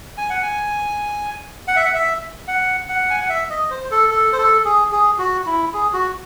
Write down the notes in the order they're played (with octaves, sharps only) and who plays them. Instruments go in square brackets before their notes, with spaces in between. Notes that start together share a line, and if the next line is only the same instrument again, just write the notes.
[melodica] G#5
F#5
G#5
F#5
E5
F#5
E5
F#5
F#5
G#5
F#5
E5
D#5
C5
A4
A4
C5
A4
G#4
G#4
F#4
E4
G#4
F#4